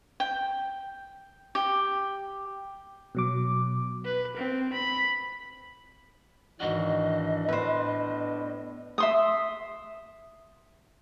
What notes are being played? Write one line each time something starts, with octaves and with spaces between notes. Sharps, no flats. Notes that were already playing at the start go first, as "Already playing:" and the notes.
G5
G4
B2 F#3 D6
B4
C4
B5
G#1 E3 D4 F#4 D#5
A2 B3 D4 B4 C5
E5 C6 D#6